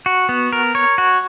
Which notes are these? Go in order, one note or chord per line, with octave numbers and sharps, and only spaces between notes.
F#4
B3
A#4
C#5
F#4